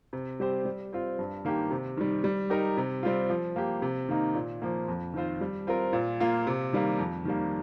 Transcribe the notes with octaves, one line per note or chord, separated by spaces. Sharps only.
C3
G3 C4 G4 C5
G3
C4 F4
G2
D#3 A#3 G4
C3
D#3 G3
G3
D#4 G4 A#4
C3
G3 C4 F4
F3
A#3 G4
C3
D#3 A#3 D#4
A#2
F3 A#3
F2
D#3 C4 F4 C5
G3
C4 F4 A#4
A#2
A#3 F4
C3
D#3 G3 A#3
F2
D#3 G3 A#3